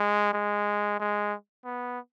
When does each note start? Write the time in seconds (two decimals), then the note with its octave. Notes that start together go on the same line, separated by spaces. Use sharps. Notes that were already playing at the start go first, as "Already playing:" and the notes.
Already playing: G#3
0.33 G#3
1.00 G#3
1.65 B3